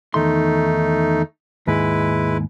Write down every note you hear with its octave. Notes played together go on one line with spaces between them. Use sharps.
E2 D#3 A3 D#4 C6
D#2 G#2 G#3 E4 B4